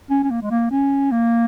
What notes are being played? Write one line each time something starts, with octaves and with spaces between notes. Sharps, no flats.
C#4
C#4
A#3
G#3
A#3
C#4
A#3